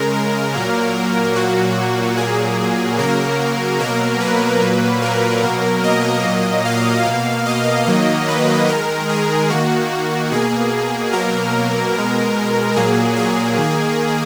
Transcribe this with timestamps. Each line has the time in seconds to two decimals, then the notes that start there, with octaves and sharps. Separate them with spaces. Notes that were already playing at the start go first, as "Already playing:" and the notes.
Already playing: C#3 G#3 A#4
0.54 A#2 F#3 A#3
1.35 A#2 F#3 A#3 F#4
2.17 A#2 F#3 A#3 G#4
2.98 C#3 F#3 A#3 A#4
3.79 B2 F#3 A#3 A#4
4.20 B4
4.61 A#2 F#3 A#3
5.02 A#4
5.43 B2 F#3 A#3
5.84 D#5
6.25 A#2 F#3 A#3
6.65 F5
7.06 B2 A#3
7.46 D#5
7.87 D#3 F#3 A#3
8.28 B4
8.68 D#3 G#3 A#4
9.09 G#4
9.50 D#3 A#3 F#4
10.31 B2 A#3 G#4
11.12 B2 F#3 A#3 A#4
11.94 B2 G#3
12.76 A#2 F#3 A#3 G#4
13.16 G#4
13.57 D#3 A#3